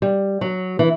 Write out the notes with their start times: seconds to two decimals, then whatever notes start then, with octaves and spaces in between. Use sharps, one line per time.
0.02 G3
0.41 F#3
0.79 E3